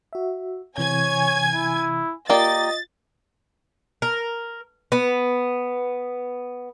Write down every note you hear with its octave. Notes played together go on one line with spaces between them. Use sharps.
F#4 E5
C3 E3 C#5 G#5 G#6
E4
A#3 F4 G4 D5 D#5 A6
A#4
B3